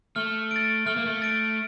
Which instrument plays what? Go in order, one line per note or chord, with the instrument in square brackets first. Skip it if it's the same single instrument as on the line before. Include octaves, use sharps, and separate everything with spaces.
[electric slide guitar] A3 [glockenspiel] F6
[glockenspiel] A6 D7
[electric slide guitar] A3 [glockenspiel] F6
[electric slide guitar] A#3
A3
[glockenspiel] A6 D7